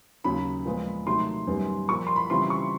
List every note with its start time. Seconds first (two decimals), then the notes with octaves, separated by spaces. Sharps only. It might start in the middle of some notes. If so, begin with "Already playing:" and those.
0.24 D#2 C#3 F#3 B5
0.65 A#2 F3 G#3 B3
1.06 C3 D#3 F#3 A3 C6
1.47 F#2 D#3 G3 B3
1.89 A#2 F3 A#3 C#6
2.07 C6
2.16 B5
2.30 C#3 E3 G3 C4 F4 C6
2.50 C#6